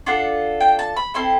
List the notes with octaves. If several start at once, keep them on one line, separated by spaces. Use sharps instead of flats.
D4 F4 A4 F#5
G5
A5
B5
C4 E4 A4 C6